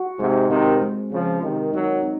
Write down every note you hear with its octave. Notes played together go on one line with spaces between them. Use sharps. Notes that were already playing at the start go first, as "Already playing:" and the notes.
Already playing: F#4
G#2 C3 G#3
C3 D#3 C4
G#3
C#3 F3 G#3
C3 D#3 D#4
D#3 F#3 D#4
C4